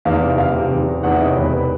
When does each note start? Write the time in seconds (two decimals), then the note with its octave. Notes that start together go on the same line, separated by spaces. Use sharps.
0.05 E2 F5
0.21 C3 E5
0.38 F#1 F5
0.54 C3
0.71 E2
0.87 C3
1.03 E2 F#5
1.12 E5
1.20 C3 D#5
1.28 C#5
1.36 E1 B4
1.53 B4